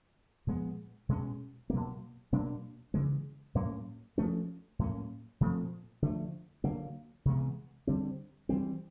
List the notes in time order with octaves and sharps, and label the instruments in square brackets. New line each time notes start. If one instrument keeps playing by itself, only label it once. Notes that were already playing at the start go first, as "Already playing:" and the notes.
[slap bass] A#2 F3 G#3 B3
B2 G#3 C#4
B2 F#3 A#3
B2 F#3 A#3 D4
C#3 E3 G#3
A2 F#3 A#3 C#4
F3 A3 C#4
A2 F#3 A#3 C#4
A#2 F3 A3 C4
D3 F3 A3
D3 F#3 A#3
C3 E3 G#3 B3
D3 G3 C4
E3 G3 C4